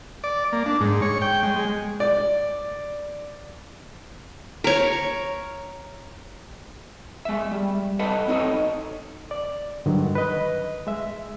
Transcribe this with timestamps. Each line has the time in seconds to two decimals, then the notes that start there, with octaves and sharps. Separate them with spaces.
0.24 D5
0.53 A#3
0.66 D4
0.81 G#2
1.02 C#5
1.22 G5
1.43 G#3
1.56 G#3
2.00 D5
4.64 A#4 C#5
7.25 G#3 E5
7.51 G3
7.99 A4 B4 D#5 F#5 A5
8.28 C4 D#4 A4 C#5 D#5
9.31 D5
9.86 G2 D3 D#3 F#3
10.15 B4 D#5
10.87 G#3 E5